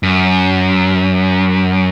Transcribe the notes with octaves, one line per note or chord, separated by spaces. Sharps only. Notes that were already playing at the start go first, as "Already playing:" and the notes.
F#2